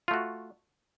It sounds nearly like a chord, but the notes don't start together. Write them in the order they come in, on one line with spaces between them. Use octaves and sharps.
F4 A3 F#4